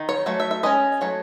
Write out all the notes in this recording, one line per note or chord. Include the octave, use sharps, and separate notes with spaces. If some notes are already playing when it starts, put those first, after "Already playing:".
Already playing: D#3
C#5
F#3 A3
E5
E5
G#3 C#4 D#5
F#3 A3 C#5